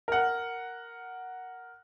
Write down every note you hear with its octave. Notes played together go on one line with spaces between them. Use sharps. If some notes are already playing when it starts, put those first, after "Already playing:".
A#4 F#5